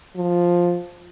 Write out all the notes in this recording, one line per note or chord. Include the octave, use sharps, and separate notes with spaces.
F3